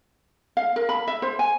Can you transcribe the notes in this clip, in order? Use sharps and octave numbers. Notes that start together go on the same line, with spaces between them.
F5
A#4
B5
E5
C5
G#5